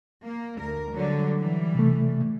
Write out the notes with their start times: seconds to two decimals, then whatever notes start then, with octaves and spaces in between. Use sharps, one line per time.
0.24 A#3
0.58 D2 A#4
0.93 D3 F#3 G3
1.39 E3 G3
1.75 C3 A3